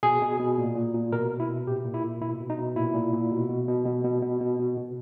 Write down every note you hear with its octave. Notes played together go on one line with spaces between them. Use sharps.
B2 G#4
B2
B2
A#2
A#2
A#2
B2 A#4
B2
E4
B2
A#2 G4
A#2
E4
A#2
B2 E4
B2
D#4
B2
A#2 E4
A#2
A#2
B2
B2
B2
B2
B2
B2
B2
B2
B2